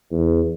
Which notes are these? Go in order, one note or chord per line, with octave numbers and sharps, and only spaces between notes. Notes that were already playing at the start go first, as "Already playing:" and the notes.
E2